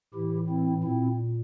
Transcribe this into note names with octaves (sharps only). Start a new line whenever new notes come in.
A2 E3 E4 G4
C4 E4
A#2 C4 E4